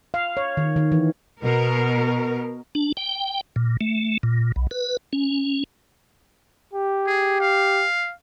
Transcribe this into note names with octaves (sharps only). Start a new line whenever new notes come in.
F5
C#5
D#3
D#3
E3
B2 A#4
D4
G5
A#2
A3
A#2
B1
B4
C#4
G4
G#4
F5